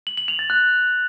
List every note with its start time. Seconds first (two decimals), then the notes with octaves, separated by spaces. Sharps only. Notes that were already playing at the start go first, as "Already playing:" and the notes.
0.07 F#7
0.17 F#7
0.28 F7
0.39 A6
0.50 F#6